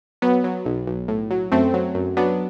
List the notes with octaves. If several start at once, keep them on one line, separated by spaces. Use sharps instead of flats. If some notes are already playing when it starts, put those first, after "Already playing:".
F#3 B3
F#3
B1
B1
A2
F#3
F#2 A3 C4
F#3
F#2
F#3 B3 D4